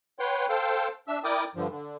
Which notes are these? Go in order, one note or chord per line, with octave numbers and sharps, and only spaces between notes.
B4 C#5 F#5 G5 C6
A4 C5 F5 G5
D4 E5 E6
E4 A#4 D5 G5 D6 D#6
G2 D3 F3
D3